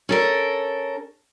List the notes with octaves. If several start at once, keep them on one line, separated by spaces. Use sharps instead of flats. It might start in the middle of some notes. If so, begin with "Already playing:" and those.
C#4 A4 A#4